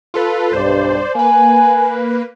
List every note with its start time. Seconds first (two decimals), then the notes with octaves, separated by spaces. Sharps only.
0.14 F4 A4 B4
0.53 B1 G2 C5 D5
1.15 A#3 B4 G#5